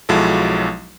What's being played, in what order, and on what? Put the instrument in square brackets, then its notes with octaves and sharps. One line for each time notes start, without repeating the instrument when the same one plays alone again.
[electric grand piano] B1 F3 F#3 G#3 E4 A4